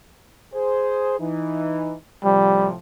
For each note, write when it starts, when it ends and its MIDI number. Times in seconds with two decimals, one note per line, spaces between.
0.54 1.19 68
0.54 1.19 72
1.20 1.94 52
1.20 1.94 63
2.25 2.75 45
2.25 2.75 48
2.25 2.75 53
2.25 2.68 55